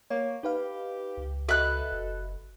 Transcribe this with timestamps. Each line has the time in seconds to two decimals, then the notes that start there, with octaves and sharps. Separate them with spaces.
0.10 A#3 C#5
0.43 D#4 G4 B4 F5
1.17 C#2
1.49 F#4 A4 B4 D#5 E5 F#6
1.92 F#1